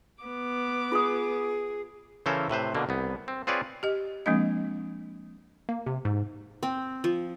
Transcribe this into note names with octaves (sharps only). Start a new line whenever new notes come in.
B3 D6
F4 G#4 D#6
C#3 E3 C#4 A4 A#4 C5
A2 C3 B4 C5
B2 D3 A#3
C2 B3
C4
C4 F4 G#4 B4 C#5 D5
G4 D#5
F3 G#3 A#3 C4 D4 D#5
A#3
C3
G#2
C4
F3